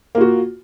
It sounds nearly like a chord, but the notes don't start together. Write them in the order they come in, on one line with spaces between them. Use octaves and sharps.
A#3 F4 F#4